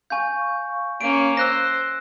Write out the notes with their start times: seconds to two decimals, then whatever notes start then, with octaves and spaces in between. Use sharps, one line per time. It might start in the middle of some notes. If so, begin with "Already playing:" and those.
0.10 F5 G#5 C#6 G6
1.01 A#3 C#4 D7
1.37 C5 E6 F#6 A#6